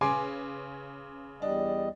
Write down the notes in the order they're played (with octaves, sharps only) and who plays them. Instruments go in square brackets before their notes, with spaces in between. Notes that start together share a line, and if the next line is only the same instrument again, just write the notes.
[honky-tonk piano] C#3 C#4 B4 [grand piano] G#5 C6 D6
[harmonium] E2 G3 D#5 [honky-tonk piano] D4